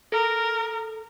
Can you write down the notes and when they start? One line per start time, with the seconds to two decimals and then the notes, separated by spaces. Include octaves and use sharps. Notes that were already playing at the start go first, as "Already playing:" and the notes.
0.12 A4 A#4